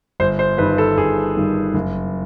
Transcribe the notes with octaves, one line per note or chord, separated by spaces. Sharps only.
G1 C5
C5
G2 D#3 B4
A4
G1 G#4
G2 D#3
F#1